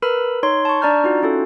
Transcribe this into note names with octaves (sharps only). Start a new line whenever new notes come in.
A#4 B4 B5 E6
D#4 C#5 C6
A5 C#6
D4 D5 A#5 F6 G6
D#4 F4 F#4
C#4 E4 F#4 A4